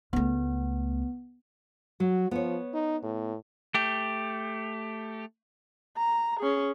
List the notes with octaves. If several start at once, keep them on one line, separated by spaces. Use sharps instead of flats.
C#2 A3 B3
F#3 F#4
F3 B3 C#5
D#4
A2
A3 G4
A#5
C#4 G#4